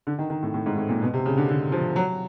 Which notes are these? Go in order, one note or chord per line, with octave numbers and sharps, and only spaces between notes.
D3
D#3
D#3
A2
A2
G#2
A2
A#2
B2
C3
C#3
D3
D3
F3
F#3